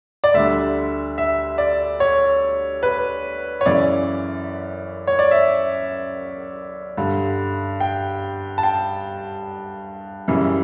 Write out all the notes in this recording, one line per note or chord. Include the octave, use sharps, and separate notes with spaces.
D5
D2 D3 G3 E5
E5
D5
C#5
B4
C#5
F#2 C#3 E3 D5
C#5
D5
E5
G2 D3 G3
G5
A5
G5
F#2 C#3 E3 G3